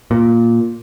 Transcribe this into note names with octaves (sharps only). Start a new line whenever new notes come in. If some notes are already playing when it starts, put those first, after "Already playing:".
A#2